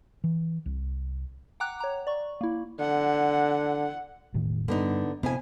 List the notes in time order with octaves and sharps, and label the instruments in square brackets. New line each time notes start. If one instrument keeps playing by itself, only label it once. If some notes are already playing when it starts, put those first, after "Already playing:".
[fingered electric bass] E3
C2
[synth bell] F#5 G5 A#5 D6 F#6
C#5 A#5
D5 C#6
A#3 E4
[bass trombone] D3 [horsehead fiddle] F#5
[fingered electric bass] E1 A2 D#3
[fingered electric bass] G2 [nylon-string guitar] D3 B3 D#4
[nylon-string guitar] F2 E4 G#5 [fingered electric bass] C3 B3 C4